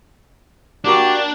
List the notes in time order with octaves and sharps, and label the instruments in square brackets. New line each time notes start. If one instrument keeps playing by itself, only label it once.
[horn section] A#3 F#4 G4 [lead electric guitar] D4